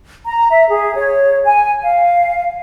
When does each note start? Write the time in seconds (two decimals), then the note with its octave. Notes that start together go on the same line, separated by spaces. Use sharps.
0.24 A#5
0.51 E5
0.69 G#4
0.96 C#5
1.45 G#5
1.81 F5